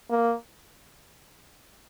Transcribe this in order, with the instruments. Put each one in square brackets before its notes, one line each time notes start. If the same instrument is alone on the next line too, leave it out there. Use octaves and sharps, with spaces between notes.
[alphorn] A#3